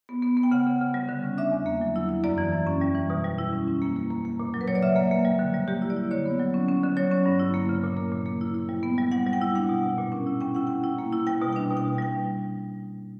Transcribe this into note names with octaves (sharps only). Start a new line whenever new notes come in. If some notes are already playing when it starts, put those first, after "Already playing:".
B3
B3
B3
G5
C#3 F#5
C#3
C#3
G3
D3
C#4
D4 E5
E2
A#3
F#3
E4
E4
F#2 D5
E3
F#2
C#4
G3
E3
B2
G3
E4
C#4
C#4
A#3
A#3
A#3
A#3
A#2
F#3
B4
F#3 C#5
D5
C#3 E5
A#3
A#3
G3
D3
G3
A#3 G4
E4
D5
E4
D3 C#5
B3
F#3
C#4
C#4
D3
F#3 C#5
C#4
G2
E4
A#3
C#3
A#2
A#3
A#2
A#3
E4
E4
G3
B3
G3
G3 F#5
G3
G5
E4
D4 F#5
B2
B2
A#2
C#4
E4
C#4 G5
E4 F#5
C#4 G5
E4
A#3
E4
G3 G5
B2
D4 G5
B2
G5
B2
G3 G5